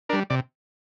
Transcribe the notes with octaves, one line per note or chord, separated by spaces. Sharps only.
G3 D4 A#4
C3 D5